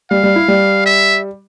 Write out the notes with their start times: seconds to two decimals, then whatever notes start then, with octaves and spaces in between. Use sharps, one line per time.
0.11 G3 F5
0.23 G3
0.36 E4
0.48 G3
0.86 E5